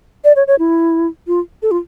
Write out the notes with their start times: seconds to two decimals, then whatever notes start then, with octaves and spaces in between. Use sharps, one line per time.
0.24 D5
0.36 C#5
0.47 C#5
0.59 E4
1.27 F4
1.62 A4
1.71 F4